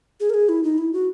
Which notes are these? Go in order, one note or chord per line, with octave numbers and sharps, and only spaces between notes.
G#4
A#4
G#4
E4
D#4
E4
F#4